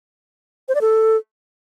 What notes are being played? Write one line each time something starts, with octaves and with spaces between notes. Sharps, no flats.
C5
D5
A4